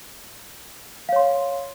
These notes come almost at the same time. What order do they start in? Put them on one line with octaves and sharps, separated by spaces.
F5 C#5 C6